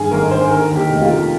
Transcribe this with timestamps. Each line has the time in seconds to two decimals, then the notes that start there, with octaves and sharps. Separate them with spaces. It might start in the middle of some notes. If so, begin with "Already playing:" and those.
Already playing: G2 D#3 G#4
0.11 G#1 A#4
0.31 G#1 C5
0.51 D#3 A#4
0.70 D#2
0.76 G4
0.90 F1
1.02 F4
1.09 F1